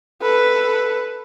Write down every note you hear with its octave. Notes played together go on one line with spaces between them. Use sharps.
A4 B4